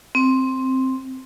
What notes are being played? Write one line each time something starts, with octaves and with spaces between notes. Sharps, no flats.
C4